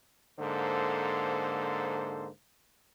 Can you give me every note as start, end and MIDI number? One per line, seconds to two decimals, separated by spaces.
0.39 2.27 44
0.39 2.27 50
0.39 2.27 58
0.39 2.27 69
0.39 2.27 72